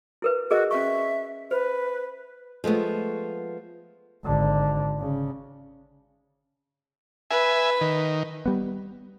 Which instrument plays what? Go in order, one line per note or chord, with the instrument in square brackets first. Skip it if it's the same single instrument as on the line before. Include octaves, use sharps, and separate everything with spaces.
[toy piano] E4 A#4 B4
[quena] F#4 [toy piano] G#4 A#4 D#5
[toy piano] C#4 C#6 [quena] E5
[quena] B4 [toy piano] C5
[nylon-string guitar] F3 G#3 A3 B3
[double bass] G#1 D3
C#3
[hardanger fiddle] B4 [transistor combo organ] E5 G#5
[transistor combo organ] D#3
[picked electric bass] G3 B3